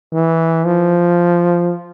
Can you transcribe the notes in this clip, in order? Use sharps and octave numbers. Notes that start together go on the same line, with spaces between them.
E3
F3